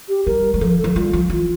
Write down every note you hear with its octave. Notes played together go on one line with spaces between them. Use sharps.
G4
G3 A#4
G3
F3 A4
A#4
A4
F3
G3 F4
F3
E3 F4